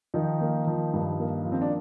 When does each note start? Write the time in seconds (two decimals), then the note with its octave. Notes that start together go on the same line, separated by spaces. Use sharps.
0.14 D#3 F3 D#4
0.41 A#3
0.67 F3
0.93 G2
1.20 A#3
1.45 F3
1.52 C4
1.61 D4